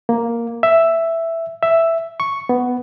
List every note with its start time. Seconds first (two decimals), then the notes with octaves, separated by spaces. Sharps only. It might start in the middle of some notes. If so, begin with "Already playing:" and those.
0.09 A#3
0.63 E5
1.63 E5
2.20 C#6
2.49 B3